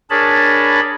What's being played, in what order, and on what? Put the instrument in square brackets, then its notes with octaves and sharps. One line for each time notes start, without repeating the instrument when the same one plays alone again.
[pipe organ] D4 G#4 A#4 C#5 A5 B5